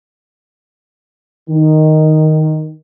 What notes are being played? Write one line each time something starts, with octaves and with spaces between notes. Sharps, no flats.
D#3